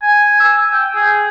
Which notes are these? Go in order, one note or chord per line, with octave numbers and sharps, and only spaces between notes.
G#5
E6
G5
G#4